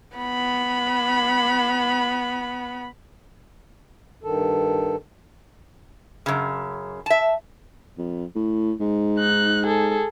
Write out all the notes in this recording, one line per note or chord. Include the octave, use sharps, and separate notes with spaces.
B3 B5
G2 D#3 A4
F#2 C#3
E5 A5
F2
A2
G#2
D#4 F#6
G#4 A4